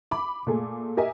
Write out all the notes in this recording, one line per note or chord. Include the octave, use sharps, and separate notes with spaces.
B5 D6
A#2 A3 G#4
G4 A#4 D#5 E5 G#5